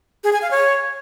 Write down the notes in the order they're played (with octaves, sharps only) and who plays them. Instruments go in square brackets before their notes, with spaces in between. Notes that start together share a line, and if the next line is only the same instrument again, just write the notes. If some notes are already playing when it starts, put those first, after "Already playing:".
[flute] G#4
G#5
F5
C#5